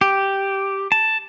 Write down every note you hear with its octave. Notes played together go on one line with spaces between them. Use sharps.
G4
A5